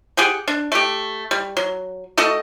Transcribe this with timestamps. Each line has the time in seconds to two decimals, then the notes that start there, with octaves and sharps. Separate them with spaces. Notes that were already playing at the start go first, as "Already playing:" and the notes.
0.17 G4 G#4 F#5 G5
0.48 D4
0.72 A3 G4
1.31 G3
1.57 F#3
2.18 A3 F#4 A4 D#5